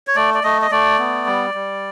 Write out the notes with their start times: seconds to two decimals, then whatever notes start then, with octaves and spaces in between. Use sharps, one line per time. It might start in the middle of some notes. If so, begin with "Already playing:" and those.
0.07 C#5
0.16 A3 D5
0.34 D5
0.44 A3 D#5
0.62 D#5
0.71 A3 D5
0.99 B3
1.26 G3
1.54 G3